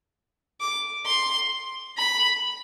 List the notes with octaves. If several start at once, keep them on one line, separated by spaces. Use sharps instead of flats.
D6
C6
B5